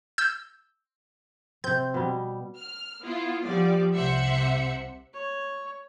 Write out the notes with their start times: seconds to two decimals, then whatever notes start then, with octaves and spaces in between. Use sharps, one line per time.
0.18 E6 G6
1.64 C3 C4 G6
1.94 B2 G3
2.57 F6
3.03 B3 E4 F4
3.44 F3 G3 B3 D5
3.95 C2 C3 C5 E5 F#5 C#7
5.14 C#5